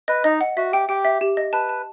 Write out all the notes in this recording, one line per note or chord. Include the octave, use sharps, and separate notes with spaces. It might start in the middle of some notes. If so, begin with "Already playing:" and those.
B4 D#5
D#4 D#5
F#5
F#4 E5
G4 G5
G4 G5
E5
G4
D#5
B4 A5
A5